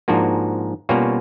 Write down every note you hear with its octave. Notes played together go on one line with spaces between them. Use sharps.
G#2 F3 A#3 D4 F#4
B2 G3 A#3 C#4 F4 F#4